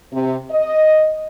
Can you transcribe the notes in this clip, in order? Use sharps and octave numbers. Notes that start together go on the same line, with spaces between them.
C3
D#5